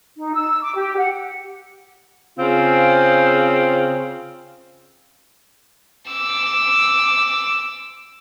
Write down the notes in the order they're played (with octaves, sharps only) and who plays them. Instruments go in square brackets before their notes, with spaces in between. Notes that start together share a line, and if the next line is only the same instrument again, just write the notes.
[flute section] D#4
E6
D6
G4
F#5
[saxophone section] C#3 C4 F4
[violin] D6 E6